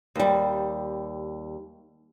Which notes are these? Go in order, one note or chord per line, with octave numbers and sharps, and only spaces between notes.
D#2 G3